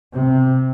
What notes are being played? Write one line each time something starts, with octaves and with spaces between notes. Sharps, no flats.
C3